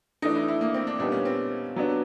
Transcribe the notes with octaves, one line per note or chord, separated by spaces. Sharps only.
E3 A3 D4 D#4
E4
E4
A#3
C4
D4
A#2 G3 B3 D4 D#4
C#4
C4
F#3 B3 D4